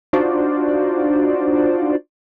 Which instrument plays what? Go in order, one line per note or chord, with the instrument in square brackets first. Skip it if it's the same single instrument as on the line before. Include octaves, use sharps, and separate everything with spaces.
[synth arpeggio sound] D4 D#4 F4 F#4 C5 D5